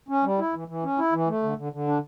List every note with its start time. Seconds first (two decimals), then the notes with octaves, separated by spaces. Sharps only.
0.09 C#4
0.24 G3
0.38 E4
0.54 E3
0.68 E3
0.84 C#4
0.98 E4
1.12 E3
1.28 A3
1.43 D3
1.57 D3
1.73 D3
1.87 D4